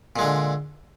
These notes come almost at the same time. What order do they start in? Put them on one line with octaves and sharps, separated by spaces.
A#2 G#3 D3